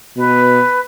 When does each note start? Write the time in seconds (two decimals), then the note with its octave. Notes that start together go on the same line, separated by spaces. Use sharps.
0.17 B2 B4